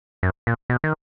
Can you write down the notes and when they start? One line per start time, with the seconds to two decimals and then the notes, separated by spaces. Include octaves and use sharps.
0.23 F#2
0.47 A#2
0.70 B2
0.84 D#3